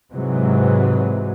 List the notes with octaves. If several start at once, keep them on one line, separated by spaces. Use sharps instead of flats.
G#2 C3 E3 F#3